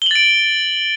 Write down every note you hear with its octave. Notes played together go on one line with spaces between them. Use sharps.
A6 D7 F#7 G7